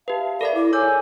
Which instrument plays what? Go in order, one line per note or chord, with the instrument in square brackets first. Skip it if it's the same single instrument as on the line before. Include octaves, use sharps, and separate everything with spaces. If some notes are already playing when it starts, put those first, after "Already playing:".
[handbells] G4 B4 [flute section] E5 F5 A5
[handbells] A4 A#4 E5 [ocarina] D5 [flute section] B5
[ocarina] E4 [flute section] D6
[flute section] G#4 G#5 E6 [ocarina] C#5 [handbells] D6 G6